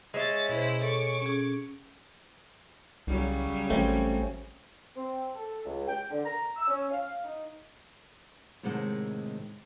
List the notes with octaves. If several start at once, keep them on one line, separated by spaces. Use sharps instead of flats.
G#3 C#4 E5 A6
B2 E4 C5
A4 C#6 D6
C#4 G#4
C2 C#3 F#3 G3
A1 A3 C4 C#4
C4
A4
C#2
G5
D3
A#5
E6
C#4
F5
D#4
A2 C3 D#3 G#3 F#5 A5